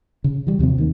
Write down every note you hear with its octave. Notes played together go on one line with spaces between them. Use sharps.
C#3
E3 G3
D#2 C3 F3 C4
D#2 D#3 F3 A#3